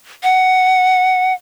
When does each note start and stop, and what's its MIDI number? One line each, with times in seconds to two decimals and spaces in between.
0.24 1.33 78